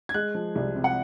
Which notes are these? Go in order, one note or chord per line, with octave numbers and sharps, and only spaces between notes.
G#6
G#3 F#6
F3
C2
C3
F#5